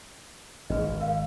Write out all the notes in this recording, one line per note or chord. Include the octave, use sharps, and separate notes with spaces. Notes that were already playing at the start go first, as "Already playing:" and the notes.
G#1 G#4 B4 D#5
A#4 F5